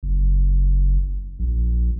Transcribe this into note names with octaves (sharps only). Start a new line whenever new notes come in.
F#1
A#1